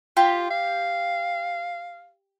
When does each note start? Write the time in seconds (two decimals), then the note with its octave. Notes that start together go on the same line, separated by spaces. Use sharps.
0.17 F4 G4
0.50 F5